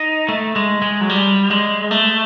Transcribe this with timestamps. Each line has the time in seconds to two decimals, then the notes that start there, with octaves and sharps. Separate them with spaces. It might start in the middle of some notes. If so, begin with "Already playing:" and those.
Already playing: D#4
0.29 A3
0.56 G#3
0.82 G#3
1.01 F#3
1.10 G3
1.51 G#3
1.91 A3